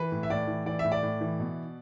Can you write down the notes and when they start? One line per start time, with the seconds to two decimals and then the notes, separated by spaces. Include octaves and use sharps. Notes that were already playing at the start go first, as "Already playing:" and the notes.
Already playing: E3 B4
0.12 A2
0.23 E5
0.30 A2 D5
0.47 E3
0.66 E3 D5
0.79 E5
0.85 A2
0.92 D5
1.03 A2
1.21 E3
1.40 B2